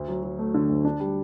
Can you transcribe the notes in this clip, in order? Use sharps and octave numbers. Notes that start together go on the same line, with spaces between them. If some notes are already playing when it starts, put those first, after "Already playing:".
Already playing: D2
F#3
F#3
A3
D3
D2
D4
G3